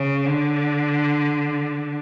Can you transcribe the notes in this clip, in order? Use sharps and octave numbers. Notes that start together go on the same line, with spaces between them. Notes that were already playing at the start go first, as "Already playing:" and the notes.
Already playing: C#3
D3